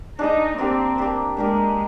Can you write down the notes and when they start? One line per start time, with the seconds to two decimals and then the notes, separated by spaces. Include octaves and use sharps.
0.19 D4 D#4 G#4 D#5
0.58 A#3 C4 D4 G4
0.98 A#3 D4 G4
1.36 G#3 A#3 D4 G4 A#4